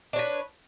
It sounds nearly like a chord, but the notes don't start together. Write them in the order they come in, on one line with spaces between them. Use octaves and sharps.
D4 C#5 B4